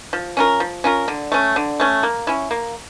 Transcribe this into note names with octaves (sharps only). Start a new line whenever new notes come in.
F3
C#4 F4 A#4
F3
C#4 F4 A#4
D3
A3 C#4
D3
A3 C#4
A#3
C#4 E4
A#3